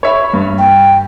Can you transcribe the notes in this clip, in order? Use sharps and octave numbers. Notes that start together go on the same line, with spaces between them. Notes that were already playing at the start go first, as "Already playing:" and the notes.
C#5 E5 B5
G2
G5